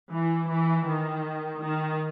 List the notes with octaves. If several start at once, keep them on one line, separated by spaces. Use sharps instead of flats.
E3
E3
D#3
D#3